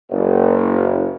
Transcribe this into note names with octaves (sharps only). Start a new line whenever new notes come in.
F#1